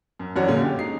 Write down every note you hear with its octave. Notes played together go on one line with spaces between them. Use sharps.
F#2
A1 F#2 D4 F#4 C#5
A#2 D3 G#3 C#4
G4
D#4 C7